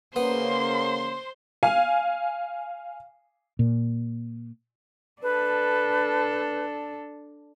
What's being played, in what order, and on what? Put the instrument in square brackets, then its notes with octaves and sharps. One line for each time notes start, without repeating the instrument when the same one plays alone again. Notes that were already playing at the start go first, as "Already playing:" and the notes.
[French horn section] C#3 A#3 [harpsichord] B3 [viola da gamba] C5 [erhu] C6
[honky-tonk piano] F5 G#5
[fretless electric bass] A#2
[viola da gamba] D4 A4 [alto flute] B4